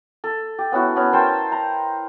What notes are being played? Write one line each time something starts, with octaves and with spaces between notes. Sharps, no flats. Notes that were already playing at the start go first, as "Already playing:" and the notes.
A4
G4
B3 C#4 E4 F#4
B3 C#4
A#4 C5 G5 A5
A#5